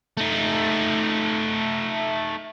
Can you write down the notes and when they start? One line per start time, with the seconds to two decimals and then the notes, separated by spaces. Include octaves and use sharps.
0.17 A3 D#4